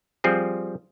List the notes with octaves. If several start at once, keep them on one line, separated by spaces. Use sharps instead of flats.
F3 G3 C4 G#4